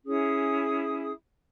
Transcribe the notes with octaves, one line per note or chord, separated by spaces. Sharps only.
C#4 E4 G#4 D#6